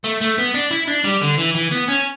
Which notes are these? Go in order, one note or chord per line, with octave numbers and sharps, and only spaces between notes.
A3
A3
B3
D4
E4
D4
G3
D3
E3
E3
B3
C#4